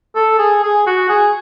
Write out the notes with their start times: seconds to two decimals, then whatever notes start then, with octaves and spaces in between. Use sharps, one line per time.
0.15 A4
0.39 G#4
0.63 G#4
0.87 F#4
1.09 G#4